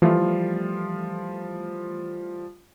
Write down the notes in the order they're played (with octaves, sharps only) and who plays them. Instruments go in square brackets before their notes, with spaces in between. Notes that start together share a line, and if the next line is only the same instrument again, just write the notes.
[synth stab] E3 A3 [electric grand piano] F3 G3 F4